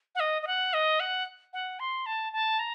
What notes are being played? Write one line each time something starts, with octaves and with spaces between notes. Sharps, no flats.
F#5
D#5
D#5
F#5
D#5
F#5
F#5
C6
A5
A5
A#5